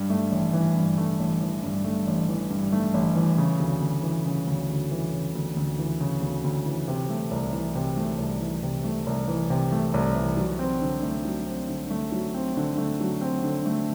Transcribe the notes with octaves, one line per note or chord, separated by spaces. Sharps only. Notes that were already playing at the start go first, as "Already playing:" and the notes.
Already playing: G2
A3
A1
E3
G2
A3
A1
E3
G2
A3
A1
E3
G2
A3
A1
E3
C#3
D2
D2
E3
C#3
D2
D2
E3
C#3
D2
D2
E3
C#3
D2
D2
E3
C3
A3
C2
E3
C3
A3
C2
E3
C3
A3
C2
E3
C3
A3
C2
E3
F#3
C4
D3
A3
F#3
C4
D3
A3
F#3
C4
D3
A3
F#3
C4
D3
A3